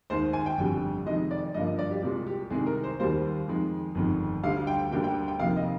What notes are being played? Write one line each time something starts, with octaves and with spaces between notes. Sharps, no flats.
D#2 D#3 G#3 C5
G#5
G5
G1 F2 D3 G3
F2 C3 D#3 G#3 D#5
D5
G2 D3 F3 A#3 D#5
D#5
D5
G4
C2 A#2 G#3 G4
G4
C2 C3 D#3 G#3 G#4
A#4
C5
D#2 D#3 G3 A#3 C5
F2 D#3 G#3
G1 F2 D#3 G#3
D2 D3 G3 F5
G5
D2 D3 G3 A#3 G5
G5
G5
F1 F2 C3 D#3 A#3 F5
D#5